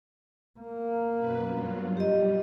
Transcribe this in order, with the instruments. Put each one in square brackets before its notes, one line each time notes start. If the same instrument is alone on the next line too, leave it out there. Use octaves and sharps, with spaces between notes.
[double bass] A#3
[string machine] F#2 B2 B4
G2 F#3 F4
[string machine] G3 [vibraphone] G4 D#5